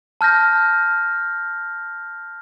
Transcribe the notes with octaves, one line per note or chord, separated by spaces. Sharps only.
A5 F6 G6 A#6